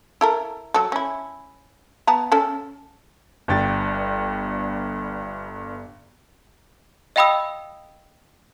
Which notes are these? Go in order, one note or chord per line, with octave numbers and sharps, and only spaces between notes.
E4 A4 A#4
F#3 A4
C#4 E4
B3 A5 A#5
C#4 A4
G1 G2 G5 A6
D#5 F5 G5 B5 D#6 E6